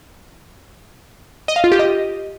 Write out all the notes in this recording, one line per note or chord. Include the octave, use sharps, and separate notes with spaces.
D#5
F5
F4
G4
D#5